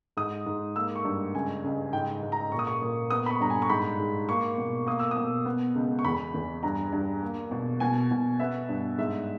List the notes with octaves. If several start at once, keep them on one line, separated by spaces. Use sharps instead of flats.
G#2 D#6
G#2
A#3 E6
C#6
G2
C#2 G#5
C#2
G#2 G5
G#2
A#5
A#2 C#6
D#6
C#6
A#2
B3 D#6
B5
C#6
G2 A#5
G#5
C#6
G#2 B5
G#2
A#3 C#6
B2
A#3 D#6
E6
D#6
B2
B3
C#2
C#6
E2 B5
E2
G2 A#5
G2
A#3
B2
B2 G#5
B2
B3 E5
G2
G#2 E5